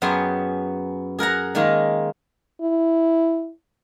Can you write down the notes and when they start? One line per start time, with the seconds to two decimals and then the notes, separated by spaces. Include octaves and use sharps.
0.02 F#2 B3 G#4 C#5 G5 C6
1.19 G#4 A#4 F#5 A#5
1.55 D#3 G#3 A#3 F5
2.62 E4